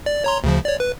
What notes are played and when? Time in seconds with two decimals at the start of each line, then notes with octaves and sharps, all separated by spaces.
0.06 D5
0.24 C#5 A#5 C6
0.44 D2 C#3 F3
0.65 C#5 D5
0.80 B4